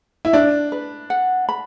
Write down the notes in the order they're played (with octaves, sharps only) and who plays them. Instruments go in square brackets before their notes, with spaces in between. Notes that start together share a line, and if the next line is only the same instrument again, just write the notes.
[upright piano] E4
[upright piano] D4 [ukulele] D5
[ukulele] B4
F#5
B5